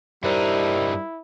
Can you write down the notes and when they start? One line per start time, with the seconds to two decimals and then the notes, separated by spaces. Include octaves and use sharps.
0.24 G2 G3 D#4 E4 A#4 C5